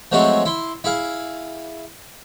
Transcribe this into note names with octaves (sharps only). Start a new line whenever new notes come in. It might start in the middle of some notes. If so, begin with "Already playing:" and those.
F3 F#3 G#3 A3 C4 F#4
E4 C6
E4 G#4 F5